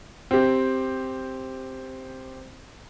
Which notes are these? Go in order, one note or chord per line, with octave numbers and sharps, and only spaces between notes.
C4 G4